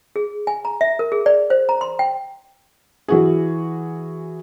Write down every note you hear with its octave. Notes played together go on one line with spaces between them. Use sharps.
G#4
G#5
A#5
E5
A#4
G#4
D5
C5
A#5
C6
G5
E3 F#4 G#4